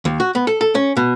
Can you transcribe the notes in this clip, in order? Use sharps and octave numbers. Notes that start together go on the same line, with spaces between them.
D#2
F#4
B3
A4
A4
C#4
B2